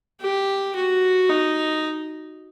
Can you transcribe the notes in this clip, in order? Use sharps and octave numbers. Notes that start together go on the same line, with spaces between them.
G4
F#4
D#4